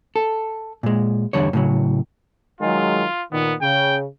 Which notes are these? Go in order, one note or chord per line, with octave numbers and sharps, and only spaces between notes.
A4
A#2 G#3
E2 D3 G3 C#5
A2 C#3 F#3
D#3 F#3 G#3 F4
A#2 D#3 B3
C#3 G5